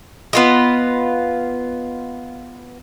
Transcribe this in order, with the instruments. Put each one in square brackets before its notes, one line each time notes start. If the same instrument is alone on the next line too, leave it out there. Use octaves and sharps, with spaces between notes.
[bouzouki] B3 F4 D#5